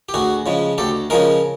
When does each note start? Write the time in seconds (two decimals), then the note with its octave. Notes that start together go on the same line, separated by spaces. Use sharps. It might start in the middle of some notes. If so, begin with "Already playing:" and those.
0.09 G4
0.14 D2 F#4 G#4
0.46 C#3 F3 G#3
0.78 D2 G4 A4
1.10 C#3 F3 G#3 G#4 A#4